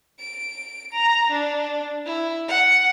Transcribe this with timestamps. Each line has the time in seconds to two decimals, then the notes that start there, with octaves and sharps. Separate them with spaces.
0.19 D7
0.93 A#5
1.31 D4
2.06 E4
2.48 F#5